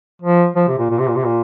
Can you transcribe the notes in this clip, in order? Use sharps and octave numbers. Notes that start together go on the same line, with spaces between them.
F3
F3
C3
A#2
A#2
C3
A#2
C3
A#2